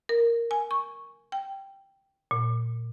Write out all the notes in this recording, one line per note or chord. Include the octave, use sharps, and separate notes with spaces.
A#4
G#5
C#6
G5
A#2